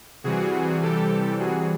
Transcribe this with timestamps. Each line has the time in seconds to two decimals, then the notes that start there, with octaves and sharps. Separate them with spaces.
0.24 C3 E3 G3 F#4 G#4
0.82 G4 A4
1.39 F#4 G#4